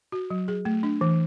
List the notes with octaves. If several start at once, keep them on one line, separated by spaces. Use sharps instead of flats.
F#4
F#3
G#4
A3
D4
E3